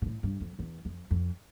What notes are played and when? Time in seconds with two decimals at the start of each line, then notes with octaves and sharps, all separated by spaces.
0.02 B2
0.06 A2
0.23 G2
0.40 F2
0.59 E2
0.85 F2
1.11 F2